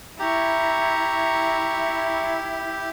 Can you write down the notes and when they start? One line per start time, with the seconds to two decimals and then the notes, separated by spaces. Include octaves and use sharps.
0.19 E4 G4 A#5 C#6